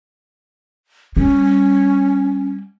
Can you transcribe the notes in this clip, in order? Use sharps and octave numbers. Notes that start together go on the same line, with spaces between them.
G3 C#4